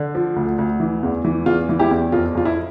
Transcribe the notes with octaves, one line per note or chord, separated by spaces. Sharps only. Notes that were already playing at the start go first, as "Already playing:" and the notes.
Already playing: D3
F3
D2
D2
E3
E2
E3
E2 F4
E3
E4 G4
E2
F2 F4
F2 F4
E4